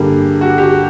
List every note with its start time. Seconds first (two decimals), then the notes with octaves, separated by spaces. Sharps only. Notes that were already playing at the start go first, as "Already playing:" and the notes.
Already playing: G2 D3 G3 A#3 G#4
0.41 F#4
0.46 G4
0.58 G4
0.63 F#4